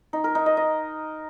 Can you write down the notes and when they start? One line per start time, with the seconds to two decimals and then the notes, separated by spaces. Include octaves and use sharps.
0.13 D#4
0.24 A#4
0.35 D#4
0.46 D#5
0.57 D#5